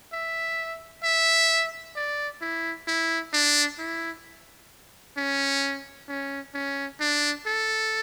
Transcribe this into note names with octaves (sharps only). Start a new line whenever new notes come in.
E5
E5
D5
E4
E4
D4
E4
C#4
C#4
C#4
D4
A4